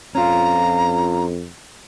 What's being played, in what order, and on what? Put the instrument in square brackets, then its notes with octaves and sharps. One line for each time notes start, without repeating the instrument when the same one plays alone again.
[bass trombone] F2 [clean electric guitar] C#4 F4 [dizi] A#5